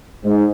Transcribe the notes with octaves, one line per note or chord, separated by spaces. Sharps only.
G#2